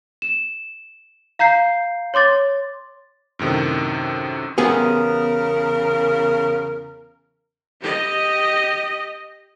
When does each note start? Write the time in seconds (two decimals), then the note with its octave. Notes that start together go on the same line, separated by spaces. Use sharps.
0.22 E7
1.39 F5 A#5 G6 C7
2.14 C#5 C6 D6 A6
3.39 F#2 A2 C3 D#3
4.58 E2 C#3 B3 G4 G#4 A#4
7.81 G4 D#5